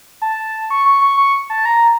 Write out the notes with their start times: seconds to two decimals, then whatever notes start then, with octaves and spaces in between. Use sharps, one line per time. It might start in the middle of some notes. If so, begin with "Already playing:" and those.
0.22 A5
0.70 C#6
0.85 C#6
1.01 C#6
1.17 C#6
1.50 A5
1.65 A#5